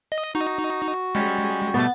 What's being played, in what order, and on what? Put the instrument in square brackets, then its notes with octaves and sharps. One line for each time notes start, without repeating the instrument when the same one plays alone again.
[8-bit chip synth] D#5
[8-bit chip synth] D#4 [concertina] F#4
[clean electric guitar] G3 C#4 [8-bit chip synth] G#3
[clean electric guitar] B2 G3 A3 [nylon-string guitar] B3 [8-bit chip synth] A6